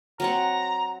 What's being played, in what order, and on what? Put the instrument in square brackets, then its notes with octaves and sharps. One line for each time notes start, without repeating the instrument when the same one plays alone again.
[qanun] F#3 C4 F#5 [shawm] A#5